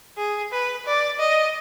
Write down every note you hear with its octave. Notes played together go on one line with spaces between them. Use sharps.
G#4
B4
D5
D#5